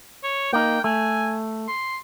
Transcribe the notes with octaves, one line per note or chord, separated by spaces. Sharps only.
C#5
A#3 D#4 G5
A3 G#5
C6